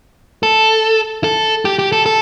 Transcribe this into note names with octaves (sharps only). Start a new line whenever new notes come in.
A4
A4
G4
G4
A4
A4